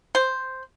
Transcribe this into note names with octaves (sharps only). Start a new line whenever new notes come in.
C5